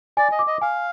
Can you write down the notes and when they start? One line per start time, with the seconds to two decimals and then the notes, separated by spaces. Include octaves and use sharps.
0.17 D5 G#5
0.32 D#5
0.39 D6
0.47 D#5
0.61 F5 G#5